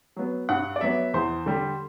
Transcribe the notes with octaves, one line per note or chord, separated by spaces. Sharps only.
F#3 B3
G2 F#5
D5
F#3 B3 E5
E2 C5
D3 G3